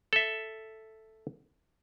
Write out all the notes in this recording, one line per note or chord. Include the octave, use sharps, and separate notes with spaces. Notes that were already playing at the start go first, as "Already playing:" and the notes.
A4 E5